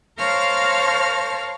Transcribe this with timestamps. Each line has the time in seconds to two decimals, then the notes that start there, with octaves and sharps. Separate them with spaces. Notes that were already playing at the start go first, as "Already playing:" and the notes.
0.18 A#4 C5 C#5 F5 A5 F6